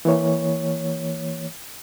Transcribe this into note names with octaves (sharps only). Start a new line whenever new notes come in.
E3 A#3 C#5